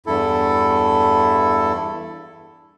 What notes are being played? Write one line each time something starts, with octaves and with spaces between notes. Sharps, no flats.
E2 G2 E4 A4